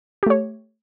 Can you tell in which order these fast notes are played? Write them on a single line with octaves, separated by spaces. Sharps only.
G4 A3 C#5